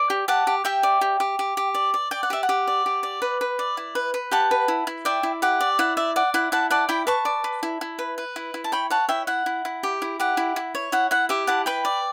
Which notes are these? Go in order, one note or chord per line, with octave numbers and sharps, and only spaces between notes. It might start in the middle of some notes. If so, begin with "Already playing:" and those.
Already playing: D5
G4
G4 F#5 A5
G4
G4 E5 G5
D5
G4
G4
G4
G4
D5
D5
D5 G5
F#5
G4 E5
F#5
G4
D5
G4
D5
B4
B4
D5
E4
B4
B4
G4 F#5 A5
B4
E4
E4
D5 E5 G5
E4
G4 F#5
D5
E4 F#5
D5 E5
D5 F#5
E4 F#5
E4 F#5 A5
D5 F#5 A5
E4 G5 B5
B4 A5 C#6
D5
B4
E4
E4
B4
B4
E4
E4
A5
C#5 G5 B5
C#5 F#5 A5
E4 E5 G5
E4 F#5
E4
E4
G4
E4
G4 F#5
E4
E4
C#5
E4 F#5
E4 F#5
G4 E5
E4 F#5 A5
B4 G5 B5
D5